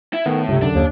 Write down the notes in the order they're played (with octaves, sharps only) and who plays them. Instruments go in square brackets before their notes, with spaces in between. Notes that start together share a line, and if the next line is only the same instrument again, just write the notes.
[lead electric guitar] E4
[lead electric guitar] A2 [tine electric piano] D#3 B3
[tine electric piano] C#2 G2 [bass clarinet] C3
[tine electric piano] F#2 D3 [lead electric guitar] D4
[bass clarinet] D#2